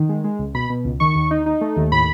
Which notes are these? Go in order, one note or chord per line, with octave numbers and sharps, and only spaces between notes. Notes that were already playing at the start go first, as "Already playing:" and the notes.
Already playing: D#3
G#3
G#3
C#2
B2 B5
B2
C#2
D#3 C#6
D#2
D#4
D#4
A3
D#2
A2 B5